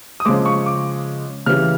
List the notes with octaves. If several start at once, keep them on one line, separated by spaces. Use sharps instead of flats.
D#6
C#3 F3 G#3 D6
C#6
D6
C#3 E3 G3 F6